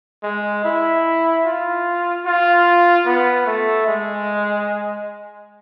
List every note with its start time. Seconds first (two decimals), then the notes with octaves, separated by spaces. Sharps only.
0.23 G#3
0.64 E4
1.45 F4
2.26 F4
3.06 B3
3.46 A3
3.87 G#3